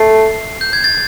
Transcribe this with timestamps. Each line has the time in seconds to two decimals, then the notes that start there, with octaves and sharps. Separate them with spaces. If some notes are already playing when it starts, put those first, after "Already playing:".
Already playing: A3 C7
0.61 G6
0.73 G#6
0.84 A6